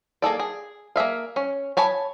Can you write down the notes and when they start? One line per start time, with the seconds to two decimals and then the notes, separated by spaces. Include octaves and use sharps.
0.22 A#3 G#4 A4 D5
0.39 G#4
0.96 A#3 G#4 E5 F5
1.36 C#4
1.77 C#5 G#5 A5 B5